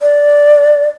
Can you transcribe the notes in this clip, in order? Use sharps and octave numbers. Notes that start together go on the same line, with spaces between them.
D5